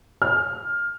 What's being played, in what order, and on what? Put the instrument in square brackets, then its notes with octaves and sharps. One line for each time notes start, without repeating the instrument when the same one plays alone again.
[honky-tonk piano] F6